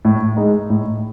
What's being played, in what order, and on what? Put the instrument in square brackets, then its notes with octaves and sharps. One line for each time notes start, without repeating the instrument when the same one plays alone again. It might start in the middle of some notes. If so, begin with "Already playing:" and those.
[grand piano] A2
G#3 D#4
A2